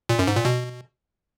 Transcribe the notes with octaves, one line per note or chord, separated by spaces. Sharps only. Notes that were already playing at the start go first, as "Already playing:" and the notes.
A#2
F#2
G#2
A#2
B2